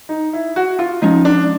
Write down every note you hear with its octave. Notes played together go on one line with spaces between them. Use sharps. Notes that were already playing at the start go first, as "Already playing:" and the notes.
D#4
E4
F#4
F4
F3 G#3 C#4 D#4
D4